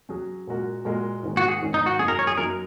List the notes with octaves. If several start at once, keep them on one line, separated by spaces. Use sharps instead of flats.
F#3 C#4 G#4
A#2 G#3 F#4 A#4
A#2 G#3 F#4 A#4
G#2 D#3 A#3 C#4
F#4
G#4
G#2 D#3 A#3 C#4
D#4
F#4
F#2 F#3 D#4 G#4
A#4
C#5
G#4
F#2 F#3 D#4 A#4